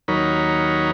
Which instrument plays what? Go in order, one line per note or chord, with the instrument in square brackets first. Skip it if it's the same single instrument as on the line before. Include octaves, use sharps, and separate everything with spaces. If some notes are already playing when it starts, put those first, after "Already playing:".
[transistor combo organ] D#2 F#3 D#4 A#4 C#5 B5